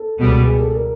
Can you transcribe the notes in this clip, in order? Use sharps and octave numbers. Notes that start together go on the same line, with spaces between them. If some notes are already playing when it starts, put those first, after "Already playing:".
Already playing: A4
C#2 B2 G3
G#4
A4
A#4